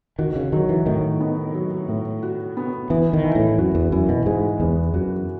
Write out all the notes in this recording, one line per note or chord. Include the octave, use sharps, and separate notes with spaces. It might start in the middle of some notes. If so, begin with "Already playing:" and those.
D#3 F#4
C#3
D#3 F#3
E3
A2 D#3
B3
F#3
A2
F#4
B3
E3 B3
D#3
E3
A2
F#2 F#4
E2
F#2 E3
B2
G#2 G#3
E2 B3
F#2 F#4